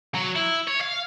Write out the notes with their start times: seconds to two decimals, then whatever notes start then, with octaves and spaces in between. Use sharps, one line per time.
0.14 F#3
0.35 E4
0.68 C#5
0.81 F5